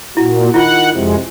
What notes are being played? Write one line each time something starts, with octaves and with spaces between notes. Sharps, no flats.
A#2 E4 F#4
D#3 E4 F4 F#5
F2 C3 G#3